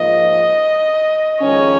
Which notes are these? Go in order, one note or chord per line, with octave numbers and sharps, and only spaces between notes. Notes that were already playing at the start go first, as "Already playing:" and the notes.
Already playing: G#2 F3 A#3 F4 D#5
F2 D#3 G#3 C#4 C#5